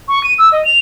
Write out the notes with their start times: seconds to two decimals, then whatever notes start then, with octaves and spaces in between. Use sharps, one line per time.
0.08 C#6
0.24 D#7
0.38 E6
0.52 D#5
0.65 F7